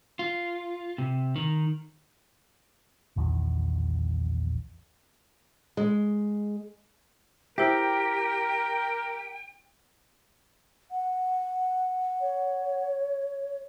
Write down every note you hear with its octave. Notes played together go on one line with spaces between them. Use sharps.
F4
C3
D#3
A#1 E2 D#3
G#3
E4 G4 A#4 C5 E5 G5
F#5
C#5